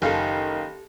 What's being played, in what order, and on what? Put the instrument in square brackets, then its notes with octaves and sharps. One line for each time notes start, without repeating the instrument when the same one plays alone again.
[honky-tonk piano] F#1 F5 [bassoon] D#3 [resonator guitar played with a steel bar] G4 A4